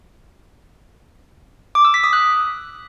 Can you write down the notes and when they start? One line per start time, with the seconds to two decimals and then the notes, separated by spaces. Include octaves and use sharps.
1.75 D6
1.85 E6
1.94 B6
2.04 D#6
2.13 F#6